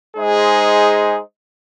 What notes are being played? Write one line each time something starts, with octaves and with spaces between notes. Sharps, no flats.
G#3 D#4 G#4 C5 D#5